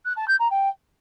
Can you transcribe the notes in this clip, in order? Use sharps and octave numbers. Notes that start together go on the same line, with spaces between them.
F#6
A5
G6
A#5
G5